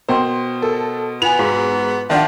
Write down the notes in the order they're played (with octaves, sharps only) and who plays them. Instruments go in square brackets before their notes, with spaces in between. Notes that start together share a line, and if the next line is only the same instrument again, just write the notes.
[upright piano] B2 C5 [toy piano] A#4 G5 C6
[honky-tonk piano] A4 [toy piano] A#4
[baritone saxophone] B3 [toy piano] F4 G#5 [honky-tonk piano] F7
[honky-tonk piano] G#2 [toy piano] F#4 F5
[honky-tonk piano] D#3 D4 [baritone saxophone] F3 [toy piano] E5 F#5